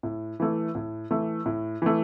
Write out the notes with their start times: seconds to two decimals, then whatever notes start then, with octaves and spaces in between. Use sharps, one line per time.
0.03 A2
0.40 E3 A3
0.75 A2
1.11 E3 A3
1.46 A2
1.82 E3 A3